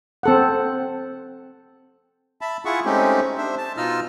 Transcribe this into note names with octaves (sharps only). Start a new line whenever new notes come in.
C4 A4 F#5
E5 A5 B5
E4 F4 G#4 E5 F#5 C#6
G#3 A3 C4 C#4 D#4 G4
D4 C5 E5
A5
B2 D#4 F4 D#5 E6 F6